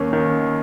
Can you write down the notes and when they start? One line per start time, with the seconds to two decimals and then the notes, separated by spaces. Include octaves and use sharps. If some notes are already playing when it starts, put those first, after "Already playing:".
Already playing: D#2 A#3 C#4
0.13 D#3